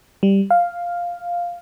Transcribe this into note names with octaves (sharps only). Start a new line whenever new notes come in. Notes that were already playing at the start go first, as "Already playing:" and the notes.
G3
F5